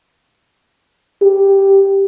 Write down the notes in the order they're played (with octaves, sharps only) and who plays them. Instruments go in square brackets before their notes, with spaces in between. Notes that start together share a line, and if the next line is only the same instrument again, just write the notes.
[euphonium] G4